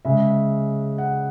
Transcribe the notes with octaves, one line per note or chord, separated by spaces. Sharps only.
C#3 G#3 E5
F#5